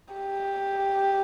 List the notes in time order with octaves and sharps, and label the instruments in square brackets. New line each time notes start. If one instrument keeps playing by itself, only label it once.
[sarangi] G4